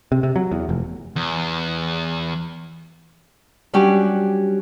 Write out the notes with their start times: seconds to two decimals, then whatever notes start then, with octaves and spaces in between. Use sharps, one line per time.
0.12 C3
0.23 C3
0.36 F#3
0.52 E2
0.69 F1
1.16 E2
3.73 F#3 G3 C#4 D4 F#4 G4